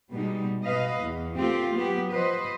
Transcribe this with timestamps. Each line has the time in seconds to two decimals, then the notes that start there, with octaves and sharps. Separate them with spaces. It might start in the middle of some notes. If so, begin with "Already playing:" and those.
0.10 B2 G3 G#3 D#4
0.63 B2 B4 D#5 F5
1.01 E2
1.37 A3 C4 F4 G4
1.75 F#3 B3 G4
2.10 F3 B4 C5 D#5